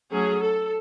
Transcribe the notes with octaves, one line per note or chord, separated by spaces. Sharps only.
F#3 A3 C#4 G#4
A4